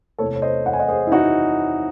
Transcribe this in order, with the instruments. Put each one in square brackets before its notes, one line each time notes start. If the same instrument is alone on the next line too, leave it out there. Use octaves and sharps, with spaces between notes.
[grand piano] E2 C3 E3 A3 A4 C#5
C#5
C5 D#5
F#5
G#5
D#5 F#5
G#4 C5
E4
D#4 F#4